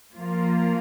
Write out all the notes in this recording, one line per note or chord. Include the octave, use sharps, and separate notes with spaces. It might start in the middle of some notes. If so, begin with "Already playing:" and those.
F3 A#3 F4